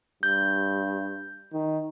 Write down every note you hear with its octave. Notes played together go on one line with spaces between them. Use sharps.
G2 G6
D#3